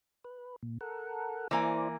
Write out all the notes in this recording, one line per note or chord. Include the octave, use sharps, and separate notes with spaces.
B4
A#2
A4 A#4 F#5
E3 A#3 E4 C5 D5 G#5